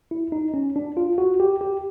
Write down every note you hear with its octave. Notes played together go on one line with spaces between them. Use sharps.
E4
D#4
C#4
D4
F4
F#4
G4
G4